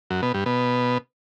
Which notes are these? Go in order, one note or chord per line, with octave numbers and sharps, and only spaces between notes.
F#2
B2
G2
B2